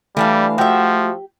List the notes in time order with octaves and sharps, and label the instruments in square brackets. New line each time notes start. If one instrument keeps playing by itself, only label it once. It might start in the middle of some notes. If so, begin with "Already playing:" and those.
[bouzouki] E3 D4 F5 [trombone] G3 [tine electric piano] A3
[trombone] F3 [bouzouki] F#4 E5 [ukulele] G4